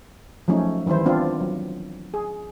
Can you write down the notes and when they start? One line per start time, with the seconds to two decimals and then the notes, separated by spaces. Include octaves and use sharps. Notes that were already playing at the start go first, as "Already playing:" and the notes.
0.48 F3 F#3 A3 C#4 D#4
0.86 D#3 E3 G3 E4 C5
1.05 B3 C4 D4 F4
1.41 F#3
2.14 G#4